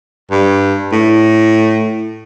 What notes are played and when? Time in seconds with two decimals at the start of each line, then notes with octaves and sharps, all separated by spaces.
0.31 G2
0.92 A2